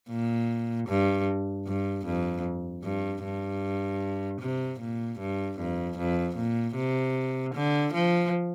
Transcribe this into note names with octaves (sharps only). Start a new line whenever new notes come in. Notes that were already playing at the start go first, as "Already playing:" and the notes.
A#2
G2
G2
F2
G2
G2
C3
A#2
G2
F2
F2
A#2
C3
D3
F3